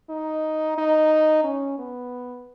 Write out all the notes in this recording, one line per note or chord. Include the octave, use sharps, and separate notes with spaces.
D#4
D#4
C#4
B3